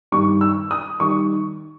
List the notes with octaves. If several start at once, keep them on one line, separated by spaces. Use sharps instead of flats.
G2 D#3 G3 C#6
E6
D#6
D#3 G3 C#6